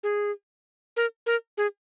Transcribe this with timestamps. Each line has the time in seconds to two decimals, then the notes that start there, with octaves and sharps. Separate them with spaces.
0.03 G#4
0.97 A#4
1.26 A#4
1.58 G#4